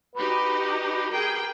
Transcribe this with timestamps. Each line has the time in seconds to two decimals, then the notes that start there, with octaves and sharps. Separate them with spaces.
0.15 D#4 F#4 G4 B4
1.10 G4 G#4 A#4 G5